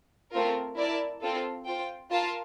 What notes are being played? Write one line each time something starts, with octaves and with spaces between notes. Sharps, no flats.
A3 C4 F4 A#4
E4 A#4 D5 A5
C4 F4 A4
F4 C5 G5
F4 A#4 F5 A5